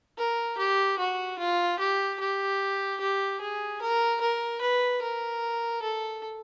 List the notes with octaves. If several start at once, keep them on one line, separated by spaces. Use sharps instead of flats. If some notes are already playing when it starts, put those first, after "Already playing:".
A#4
G4
F#4
F4
G4
G4
G4
G#4
A#4
A#4
B4
A#4
A4